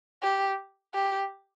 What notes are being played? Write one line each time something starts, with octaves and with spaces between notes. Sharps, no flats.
G4
G4